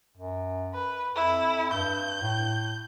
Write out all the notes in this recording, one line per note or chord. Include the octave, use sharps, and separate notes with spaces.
F#2
B4
F2 E4
G2 G6
A2